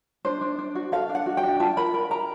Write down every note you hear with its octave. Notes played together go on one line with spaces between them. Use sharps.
D4 C5
D4
D4
F#4
A4 F5
D4
F#5
F#4
G5
D4
F4 A5
A#4 B5
A#4
A#4 A#5